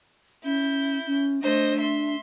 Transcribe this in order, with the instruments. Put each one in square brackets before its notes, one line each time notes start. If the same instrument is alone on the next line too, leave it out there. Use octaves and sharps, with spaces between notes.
[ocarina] C#4 [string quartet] E4 G6
[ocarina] C#4
[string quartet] A3 C5 D#5 [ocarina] D4
[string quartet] E5 C6